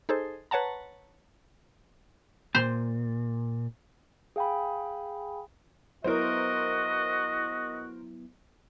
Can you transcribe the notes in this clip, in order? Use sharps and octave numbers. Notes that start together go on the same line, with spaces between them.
D#4 G#4 A4 C5
B4 C#5 F#5 A5 A#5
A#2 C5
G#4 F5 G5 G#5 B5
F#3 B3 E4 F#4 A#4 C5 D#5